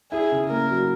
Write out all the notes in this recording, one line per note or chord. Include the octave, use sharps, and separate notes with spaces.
E4 G#4
C#3
A#3 A#4
F#3